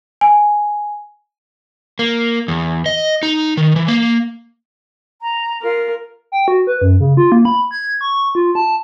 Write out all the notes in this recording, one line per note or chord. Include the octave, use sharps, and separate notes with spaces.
G#5
A#3
E2
D#5
D#4
D#3
E3
A#3
A#5
F4 A#4
G5
F#4
B4
F#2
C#3
F4
A#3
B5
G#6
C#6
F4
A5